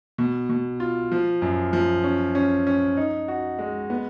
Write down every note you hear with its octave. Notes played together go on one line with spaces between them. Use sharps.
B2
B2
F4
F3
F#2
F3
C#4
C#4
C#4
D#4
F#4
G#3
B3